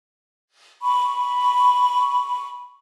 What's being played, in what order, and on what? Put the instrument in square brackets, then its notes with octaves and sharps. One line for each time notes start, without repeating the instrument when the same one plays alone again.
[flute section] B5 C#6